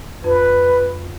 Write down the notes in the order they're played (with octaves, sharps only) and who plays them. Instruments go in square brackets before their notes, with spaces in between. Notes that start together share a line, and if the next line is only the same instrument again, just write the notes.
[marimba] F2 [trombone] B4